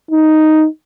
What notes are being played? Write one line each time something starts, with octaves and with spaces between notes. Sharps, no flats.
D#4